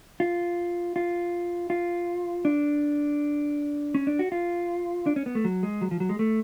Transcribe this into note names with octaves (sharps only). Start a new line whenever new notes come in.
F4
F4
F4
D4
C#4
D4
F#4
F4
D4
C#4
B3
A3
F#3
G#3
F#3
F3
F#3
G#3
A3